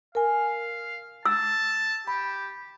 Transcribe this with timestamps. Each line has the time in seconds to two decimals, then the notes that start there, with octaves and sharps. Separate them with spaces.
0.15 A#4 F5 G#5
1.26 A5 E6
2.07 G4 B5